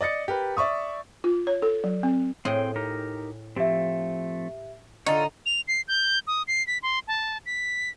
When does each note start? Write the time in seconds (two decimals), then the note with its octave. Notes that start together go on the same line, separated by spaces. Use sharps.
0.01 D5 D#5 A6 C#7
0.28 G4 A#4 B4
0.57 D5 E5 C#6 D#6
1.24 F4
1.47 C#5
1.62 A4
1.84 F#3
2.03 C4
2.45 A2 C4 G#4 D#5 G5
2.76 D#4 G4 A#4
3.56 F3 A3 C4 G4 E5
5.06 D3 D#4 F4 A4 C#5
5.46 F7
5.68 C7
5.88 G6
6.27 D#6
6.48 C7
6.67 B6
6.83 C6
7.08 A5
7.46 B6